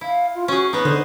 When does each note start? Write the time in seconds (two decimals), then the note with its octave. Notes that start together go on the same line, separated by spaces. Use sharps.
0.01 E4 F5
0.35 F4
0.48 C#4 F#4 G#4
0.73 B3 D#4 B4
0.85 D3 G#4 C5